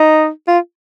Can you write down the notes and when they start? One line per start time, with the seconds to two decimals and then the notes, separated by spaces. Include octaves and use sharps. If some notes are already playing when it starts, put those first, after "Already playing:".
Already playing: D#4
0.48 F4